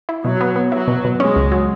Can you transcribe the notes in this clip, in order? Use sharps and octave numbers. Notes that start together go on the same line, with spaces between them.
E4
B2 F#3
B3
B3
F#3 E4
B2
B2
G#3 C#4
C#2
F#3